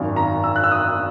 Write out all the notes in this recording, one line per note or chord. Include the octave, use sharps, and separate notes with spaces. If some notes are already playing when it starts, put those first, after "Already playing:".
Already playing: G#1 F#2 D#3
A#5
E6
F#6
E6
D#6